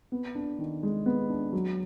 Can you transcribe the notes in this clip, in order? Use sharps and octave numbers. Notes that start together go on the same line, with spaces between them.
B3
D4
D#3
G#3
B3
D4
F#3